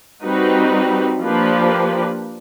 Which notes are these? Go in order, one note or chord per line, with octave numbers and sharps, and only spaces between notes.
G3 C4 D#4 F#4 B4
F3 A#3 D4 G4 B4